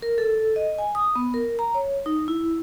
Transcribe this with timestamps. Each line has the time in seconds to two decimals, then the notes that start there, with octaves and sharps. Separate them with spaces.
0.02 A#4
0.18 A4
0.56 D#5
0.78 G#5
0.95 D#6
1.16 B3
1.34 A#4
1.59 A#5
1.75 C#5
2.06 D#4
2.28 E4